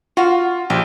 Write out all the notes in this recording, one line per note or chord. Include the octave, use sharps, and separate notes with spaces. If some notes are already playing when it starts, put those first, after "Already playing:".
F4 F#4 F5
A#1 G4